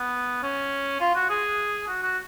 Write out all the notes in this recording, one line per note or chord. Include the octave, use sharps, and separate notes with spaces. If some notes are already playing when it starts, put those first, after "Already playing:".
Already playing: B3
C#4
F4
F#4
G#4
F#4
F#4